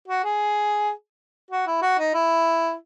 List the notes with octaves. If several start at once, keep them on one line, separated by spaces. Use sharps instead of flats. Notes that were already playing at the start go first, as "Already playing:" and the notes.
F#4
G#4
F#4
E4
F#4
D#4
E4